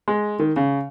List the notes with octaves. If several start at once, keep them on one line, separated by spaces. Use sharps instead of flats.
G#3
D#3
C#3